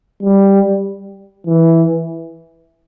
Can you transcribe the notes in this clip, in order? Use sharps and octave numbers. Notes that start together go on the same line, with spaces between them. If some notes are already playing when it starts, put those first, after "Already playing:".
G3
E3